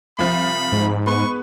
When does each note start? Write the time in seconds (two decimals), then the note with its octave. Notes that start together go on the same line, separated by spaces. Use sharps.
0.19 C2 F3 B5
0.72 G#2
1.06 G#3 B3 B4 C#6